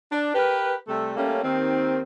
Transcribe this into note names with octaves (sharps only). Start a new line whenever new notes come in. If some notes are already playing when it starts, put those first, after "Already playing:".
D4
G4 A#4 B4
C3 G3 A3 A4
G3 A3 A#3 C#4
D#2 D#3 C4